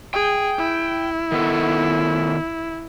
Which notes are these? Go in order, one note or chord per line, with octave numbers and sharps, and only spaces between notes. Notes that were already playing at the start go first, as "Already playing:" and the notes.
G#4 G5
E4
D#3 B3 A4